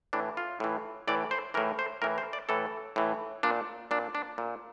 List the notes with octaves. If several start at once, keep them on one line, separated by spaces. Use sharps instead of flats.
A2 E3 D4
F4
A2 E3
A2 E3 D5
C5
A2 E3 A#4
C5
A2 E3 A#4
C5
D5
A2 E3 A4
A2 E3
A#2 D4
A#2 D4
D4
A#2